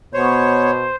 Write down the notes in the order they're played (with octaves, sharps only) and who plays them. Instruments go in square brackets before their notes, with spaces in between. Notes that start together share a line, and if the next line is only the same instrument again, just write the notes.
[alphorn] B2 [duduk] B3 [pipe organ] C5 [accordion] C#5